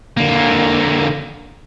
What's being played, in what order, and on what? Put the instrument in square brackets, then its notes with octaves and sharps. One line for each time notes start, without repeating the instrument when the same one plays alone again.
[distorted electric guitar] D3 A#3